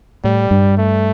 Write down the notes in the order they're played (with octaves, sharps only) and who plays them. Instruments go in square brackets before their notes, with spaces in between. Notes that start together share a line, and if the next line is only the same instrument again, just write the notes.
[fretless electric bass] A2 [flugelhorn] G3
[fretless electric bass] G2
[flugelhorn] A3